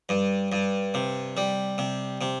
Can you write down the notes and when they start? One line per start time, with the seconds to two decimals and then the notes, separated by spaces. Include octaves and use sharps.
0.09 G2
0.52 G2
0.94 C3
1.37 G3
1.78 C3
2.21 C3